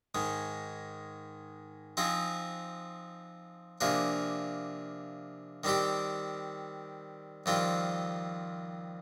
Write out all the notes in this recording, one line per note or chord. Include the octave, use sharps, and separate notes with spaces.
G#2 D#3 G#3
F3 C4 D#4 G#4
C3 F3 A#3 D4 G#4
D#3 G3 C4 G4
F2 D#3 G3 C4 F4